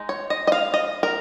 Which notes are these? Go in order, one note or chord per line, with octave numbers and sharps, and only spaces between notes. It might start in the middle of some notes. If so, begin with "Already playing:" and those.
Already playing: G#3 D#4
C#5
D#5
D#5
F5
D#5
A#4